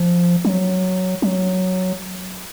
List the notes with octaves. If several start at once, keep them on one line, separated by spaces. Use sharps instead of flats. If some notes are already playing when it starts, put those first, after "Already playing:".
Already playing: F3
F#3
F#3